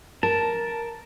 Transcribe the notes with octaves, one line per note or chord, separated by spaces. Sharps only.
A#4 A5